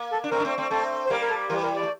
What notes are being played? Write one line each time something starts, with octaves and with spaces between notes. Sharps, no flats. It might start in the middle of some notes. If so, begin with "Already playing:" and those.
Already playing: A#3
A4
D4
A3 C4 A#4
D4
A3 C4
A3 C4
A3 C4 A4
C5
G3 A#3 A#4
A#4
A4
E3 G3 A#4
A#4
D5
A3